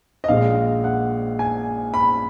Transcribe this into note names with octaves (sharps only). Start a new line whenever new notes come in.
D#5
A#1 A#2 G#3 F5
F#5
G#5
B5